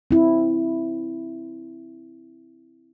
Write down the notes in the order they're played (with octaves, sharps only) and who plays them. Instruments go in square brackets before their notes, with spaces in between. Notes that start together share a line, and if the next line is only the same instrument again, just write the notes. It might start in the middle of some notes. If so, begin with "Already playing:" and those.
[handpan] C4 E4